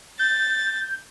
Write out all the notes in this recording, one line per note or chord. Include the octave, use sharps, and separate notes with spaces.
G6 A6